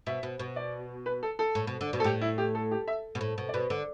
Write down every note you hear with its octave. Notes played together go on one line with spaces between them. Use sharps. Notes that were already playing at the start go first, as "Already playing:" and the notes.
B2 E5
B2
B2
D5
B4
A4
A4
A2
B2
D3
B2
A4
A2 G4
E4
G4
A4
G4
E5
B2
A2
B2
D5
B2 B4
D3